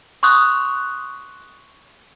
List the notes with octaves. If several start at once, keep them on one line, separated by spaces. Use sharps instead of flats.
C6 C#6 D#6 F#6